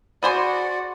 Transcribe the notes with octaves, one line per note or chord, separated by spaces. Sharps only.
F#4 G#4 C5 D5 G#5 B5 C6 D6